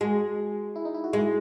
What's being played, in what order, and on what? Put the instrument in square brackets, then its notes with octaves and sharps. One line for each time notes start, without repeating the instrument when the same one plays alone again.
[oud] G#3 [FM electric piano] F#4
[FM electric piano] E4
D#4
E4
F#4
[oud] G#3 [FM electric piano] E4